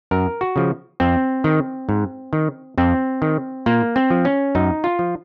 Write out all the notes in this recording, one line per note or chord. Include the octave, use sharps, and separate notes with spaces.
F#2 A#4
F#4
C#3 F3
F2 C4
D#3
G#2
D#3
F2 C4
D#3
A#2 A#3
C4
F3
C#4
F#2 D#4
F4
F3